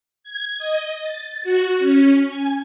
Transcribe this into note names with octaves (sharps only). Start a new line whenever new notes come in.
G#6
D#5
A6
F#4
C#4
G#5